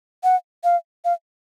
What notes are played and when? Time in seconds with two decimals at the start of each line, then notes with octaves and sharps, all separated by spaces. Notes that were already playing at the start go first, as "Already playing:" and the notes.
0.24 F#5
0.64 F5
1.05 F5